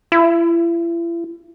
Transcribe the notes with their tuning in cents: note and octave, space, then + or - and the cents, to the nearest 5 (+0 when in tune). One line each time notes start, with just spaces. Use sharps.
E4 +40